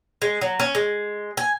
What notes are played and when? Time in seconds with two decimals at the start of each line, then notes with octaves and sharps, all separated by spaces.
0.22 G#3
0.41 F#3
0.60 C#4
0.75 G#3
1.37 G#5